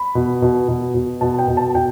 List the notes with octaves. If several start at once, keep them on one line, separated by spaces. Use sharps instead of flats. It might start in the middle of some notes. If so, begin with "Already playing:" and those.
Already playing: B5
B2
B2
B2
B2
B2 A5
G5
B2
A5
B2 G5